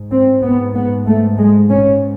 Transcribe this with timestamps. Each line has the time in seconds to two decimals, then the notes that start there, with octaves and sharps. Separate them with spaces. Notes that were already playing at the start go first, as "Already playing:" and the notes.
Already playing: G#2
0.12 C4
0.43 B3
0.74 B3
1.06 A3
1.38 G#3
1.70 C#4